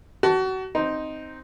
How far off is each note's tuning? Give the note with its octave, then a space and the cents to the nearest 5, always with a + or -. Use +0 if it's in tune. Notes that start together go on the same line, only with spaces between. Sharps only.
F#4 +30 A5 +0
C4 +0 D#4 +0